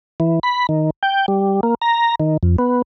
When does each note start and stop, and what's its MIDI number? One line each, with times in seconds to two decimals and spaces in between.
0.20 0.39 52
0.43 0.67 83
0.69 0.90 51
1.03 1.26 79
1.28 1.60 55
1.63 1.75 58
1.82 2.15 82
2.20 2.37 51
2.43 2.56 41
2.58 2.82 59